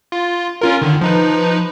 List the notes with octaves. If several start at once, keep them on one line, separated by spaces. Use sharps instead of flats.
F4
C#4 F4 A#4
D3 D#3
F3 D#4 B4